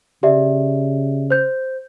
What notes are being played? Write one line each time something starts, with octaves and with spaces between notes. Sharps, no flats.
C#3 G4 D5 E5
C5 G6